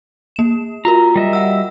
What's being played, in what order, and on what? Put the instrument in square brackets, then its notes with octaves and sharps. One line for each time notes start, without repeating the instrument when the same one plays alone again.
[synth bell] A#3 E7
[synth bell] F4 F#4 A#4 [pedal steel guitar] A#5
[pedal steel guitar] G3 D#5 E5
[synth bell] F#5 E6